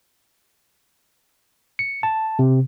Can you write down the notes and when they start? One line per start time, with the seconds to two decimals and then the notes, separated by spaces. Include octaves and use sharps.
1.79 C#7
2.03 A5
2.39 C3